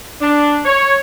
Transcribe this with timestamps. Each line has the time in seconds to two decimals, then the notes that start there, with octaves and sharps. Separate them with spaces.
0.21 D4
0.65 C#5